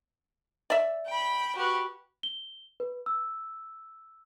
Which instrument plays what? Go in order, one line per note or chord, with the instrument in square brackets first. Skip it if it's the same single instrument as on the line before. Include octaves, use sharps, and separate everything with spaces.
[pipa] D5 E5
[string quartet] G5 B5
F#4 G4 B4
[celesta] G7
B4
E6